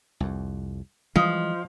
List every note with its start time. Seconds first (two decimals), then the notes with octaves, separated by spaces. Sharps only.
0.20 C2 F2
1.16 E3 F3 G3 G#3 D#5